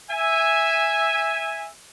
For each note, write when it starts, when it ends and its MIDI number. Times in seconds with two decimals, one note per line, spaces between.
0.11 1.68 76
0.11 1.68 80